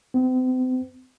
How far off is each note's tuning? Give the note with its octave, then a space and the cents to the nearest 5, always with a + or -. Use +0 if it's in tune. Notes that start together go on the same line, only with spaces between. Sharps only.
C4 -40